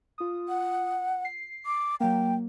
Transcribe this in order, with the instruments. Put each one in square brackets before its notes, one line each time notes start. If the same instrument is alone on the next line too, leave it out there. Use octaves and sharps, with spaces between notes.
[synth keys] F4 D#6
[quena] F#5
[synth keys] C7
[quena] D6
[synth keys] F#3 A#3 [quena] G5